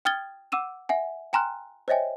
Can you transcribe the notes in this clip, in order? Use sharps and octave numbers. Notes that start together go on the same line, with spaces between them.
G5 D#6 F6 G#6 A6 G7
F#5 D6 E6 D#7 E7
E5 F#5 G#5
G5 G#5 A#5 C6 F6 F#6
C5 C#5 D#5 E5 G5 G#5